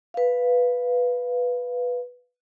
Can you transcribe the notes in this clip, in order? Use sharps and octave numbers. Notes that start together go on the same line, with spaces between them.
B4 F5